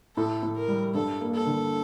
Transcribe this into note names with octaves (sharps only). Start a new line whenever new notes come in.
A2 A4
A2
A#4
G3
G2 A4
A#3
A4
D3